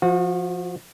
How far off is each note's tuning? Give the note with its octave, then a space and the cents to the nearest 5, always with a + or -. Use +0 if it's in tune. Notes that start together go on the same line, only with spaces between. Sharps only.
F3 +0 F#4 -35